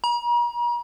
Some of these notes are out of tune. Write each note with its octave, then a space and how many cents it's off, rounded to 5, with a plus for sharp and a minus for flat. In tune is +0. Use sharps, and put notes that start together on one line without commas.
A#5 +40